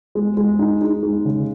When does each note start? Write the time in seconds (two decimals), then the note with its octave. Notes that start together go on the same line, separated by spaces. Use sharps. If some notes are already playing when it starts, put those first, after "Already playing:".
0.15 G#3
0.37 G#3
0.59 D#4
0.81 D#4
1.03 G#3
1.25 C#3